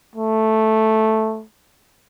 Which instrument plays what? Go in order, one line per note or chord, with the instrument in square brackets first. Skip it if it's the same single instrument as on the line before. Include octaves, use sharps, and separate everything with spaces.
[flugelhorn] A3